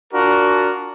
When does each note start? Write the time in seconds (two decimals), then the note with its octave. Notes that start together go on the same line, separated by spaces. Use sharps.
0.14 D4 F4 F#4 A#4